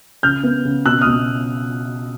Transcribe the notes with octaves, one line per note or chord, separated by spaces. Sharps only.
C#3 F6 G6
B3
C#3
B2 E6 F#6
D#6 F6
B2